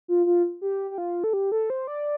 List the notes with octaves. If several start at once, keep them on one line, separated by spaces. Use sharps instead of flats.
F4
F4
G4
G4
F4
A4
G4
A4
C5
D5